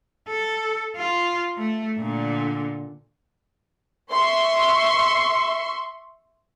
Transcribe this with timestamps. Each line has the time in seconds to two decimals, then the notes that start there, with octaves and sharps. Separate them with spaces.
0.28 A4
0.96 F4
1.57 A3
1.98 A#2 D3
4.13 E5 C6 C#6